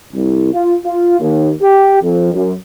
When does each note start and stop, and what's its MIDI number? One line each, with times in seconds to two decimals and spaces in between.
0.13 0.52 36
0.53 0.75 65
0.85 1.20 65
1.20 1.50 39
1.62 1.99 67
2.02 2.32 41
2.34 2.53 42